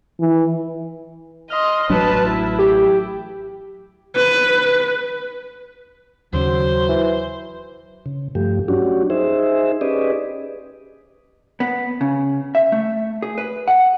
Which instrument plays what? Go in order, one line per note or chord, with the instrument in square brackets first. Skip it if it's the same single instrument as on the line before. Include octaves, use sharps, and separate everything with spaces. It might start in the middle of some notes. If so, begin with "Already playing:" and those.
[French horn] E3
[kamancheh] D#5 C6 [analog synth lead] F6
[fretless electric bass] A1 F#3 D4 [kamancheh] B4 A5
[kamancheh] E4
[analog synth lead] G4
[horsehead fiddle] B4
[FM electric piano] D#2 C#3 [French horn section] F#3 [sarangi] C5
[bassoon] E3
[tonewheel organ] C#3
G2 F3 A3 G4
F#3 C#4 D4 F#4 G4
D#4 G#4 C5 E5
C#4 G4 G#4 B4 D5 D#5
[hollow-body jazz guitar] B3
C#3
E5
A3
G#4
B4
F#5